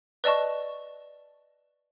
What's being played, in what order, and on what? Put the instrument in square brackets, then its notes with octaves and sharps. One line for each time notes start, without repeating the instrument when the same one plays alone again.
[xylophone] B4 D5 D#5 A5 C#6